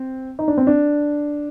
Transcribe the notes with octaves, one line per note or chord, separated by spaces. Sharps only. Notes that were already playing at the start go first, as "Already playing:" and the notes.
Already playing: C4
D#4
D4
C4
D4